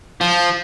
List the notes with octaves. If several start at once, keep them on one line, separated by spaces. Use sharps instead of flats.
F3